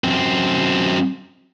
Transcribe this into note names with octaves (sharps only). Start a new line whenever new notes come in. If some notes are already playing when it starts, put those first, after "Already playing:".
F#2 C4